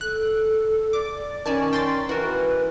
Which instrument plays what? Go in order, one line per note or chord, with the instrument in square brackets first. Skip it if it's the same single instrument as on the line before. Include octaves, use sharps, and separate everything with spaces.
[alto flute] A4 [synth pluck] F#6
[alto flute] D5 [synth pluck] D6
[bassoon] D#3 [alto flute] C#4 [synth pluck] D5 G#5 A5
[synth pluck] G5 C6 A6
[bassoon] E3 [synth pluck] F#4 A#4 [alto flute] B4